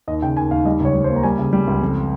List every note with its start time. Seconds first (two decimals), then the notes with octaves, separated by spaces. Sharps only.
0.08 D#2 D#5
0.22 C#3 G5
0.37 D#2 G#5
0.51 D#2 F5
0.65 G3 D#5
0.80 C#2 C#5
0.94 G3
1.04 C5
1.09 A#3
1.16 A#5
1.23 G3 G#5
1.39 C#3
1.53 G3
1.67 C#2
1.82 F2